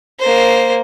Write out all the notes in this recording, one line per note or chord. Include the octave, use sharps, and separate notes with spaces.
A#3 C5